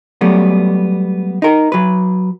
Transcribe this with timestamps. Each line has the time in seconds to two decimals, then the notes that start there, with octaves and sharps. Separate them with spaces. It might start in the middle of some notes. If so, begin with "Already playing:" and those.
0.21 F#3 G3 A3 B3
1.42 D#4 A#4
1.72 F#3 B4